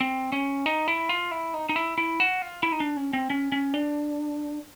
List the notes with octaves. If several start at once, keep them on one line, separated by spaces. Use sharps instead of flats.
C4
C#4
D#4
E4
F4
E4
D#4
D#4
E4
E4
F#4
F4
E4
D#4
D4
C#4
C4
C#4
C#4
D4